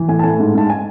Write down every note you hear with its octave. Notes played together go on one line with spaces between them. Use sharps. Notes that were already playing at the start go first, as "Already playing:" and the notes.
Already playing: E3
A2 G#5
A5
A2 G#5
G#2
G#2 A5
G#5